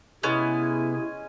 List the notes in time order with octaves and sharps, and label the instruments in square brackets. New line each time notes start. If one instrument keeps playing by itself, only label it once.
[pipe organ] C3 G#4 [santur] G#3 C#4 G#5 [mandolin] B3 [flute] E4